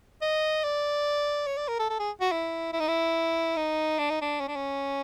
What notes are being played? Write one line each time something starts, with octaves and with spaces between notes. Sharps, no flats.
D#5
D5
C#5
D5
A#4
A4
A4
G#4
F#4
E4
E4
D#4
E4
D#4
D4
D#4
D4
C#4
D4
C#4